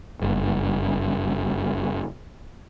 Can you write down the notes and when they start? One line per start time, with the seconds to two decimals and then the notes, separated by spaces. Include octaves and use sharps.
0.22 F#1 G2